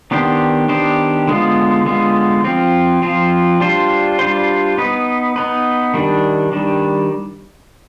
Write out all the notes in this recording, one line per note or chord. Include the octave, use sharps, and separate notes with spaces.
D#3 B3 D4 G4 C5
D#3 B3 D4 G4 C5
D3 G#3 B3 F4
D3 G#3 B3 F4
F3 C4 F4
F3 C4 F4
G3 D4 F4 C5
G3 D4 F4 C5
B3 D#4 B4
B3 D#4 B4
D#3 G3 D4
D#3 G3 D4